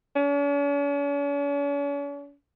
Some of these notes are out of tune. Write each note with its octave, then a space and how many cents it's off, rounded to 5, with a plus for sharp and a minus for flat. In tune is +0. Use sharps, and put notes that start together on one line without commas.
C#4 +45